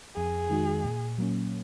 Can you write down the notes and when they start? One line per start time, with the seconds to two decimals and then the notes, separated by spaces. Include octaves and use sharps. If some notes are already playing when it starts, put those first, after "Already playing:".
0.16 F2 G#4
0.50 D#3 G#3 D#4 F#4
0.85 A#2
1.18 F#3 A#3 C#4